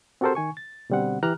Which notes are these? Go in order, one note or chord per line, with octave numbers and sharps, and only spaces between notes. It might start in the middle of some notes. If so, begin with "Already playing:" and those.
C4 F#4 G4 A4 A#4 C5
D#3 G#5 C#6
A6
B2 D3 G3 C4 F#5
E3 G4 A#5 F6 F#6